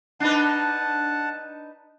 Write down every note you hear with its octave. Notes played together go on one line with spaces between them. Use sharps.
D4 D#4 B4 F#5 A5